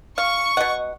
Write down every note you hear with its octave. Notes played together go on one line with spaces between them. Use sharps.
F5 C#6
B2 D#5 F#5